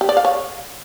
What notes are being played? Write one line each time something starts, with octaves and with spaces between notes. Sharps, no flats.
G4
D5
F5
C#5